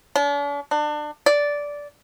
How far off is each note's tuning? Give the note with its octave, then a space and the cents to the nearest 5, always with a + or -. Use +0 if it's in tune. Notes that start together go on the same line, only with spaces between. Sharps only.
D4 -45
D4 +30
D5 -10